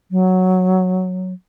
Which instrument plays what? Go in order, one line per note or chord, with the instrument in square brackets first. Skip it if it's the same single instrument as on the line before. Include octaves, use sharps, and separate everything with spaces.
[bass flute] F#3